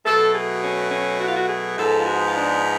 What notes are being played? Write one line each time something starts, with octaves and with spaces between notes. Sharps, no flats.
B2 F#3 A3 A4
G#4
C#4
C#4
F#4
F4
F#4
G#4
G#2 F3 G#3 B3 A4
F4
F#4
F4
D4